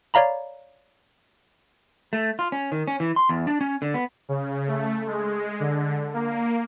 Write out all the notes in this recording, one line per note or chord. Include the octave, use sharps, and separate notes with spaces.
C#5 D5 F5 A#5 B5
A3
F4
C#4
D#3
C#4
E3
C6
E2
D4
C#4
D3
B3
C#3
A3
G#3
D3
A#3